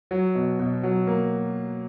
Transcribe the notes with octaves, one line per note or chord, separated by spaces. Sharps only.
F#3
B2
B2
F#3
A#3